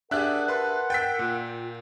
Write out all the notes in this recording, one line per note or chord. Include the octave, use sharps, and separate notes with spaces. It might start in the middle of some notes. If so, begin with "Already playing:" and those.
D4 G4 G#4 A#4 E5 F#5 F#6
B4 A5 C6
G5 E6 G6 A6 B6
A#2 F4